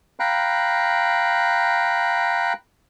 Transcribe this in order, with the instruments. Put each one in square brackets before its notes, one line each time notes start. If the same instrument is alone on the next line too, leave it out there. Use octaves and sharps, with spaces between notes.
[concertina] F5 G5 A#5 B5 F#6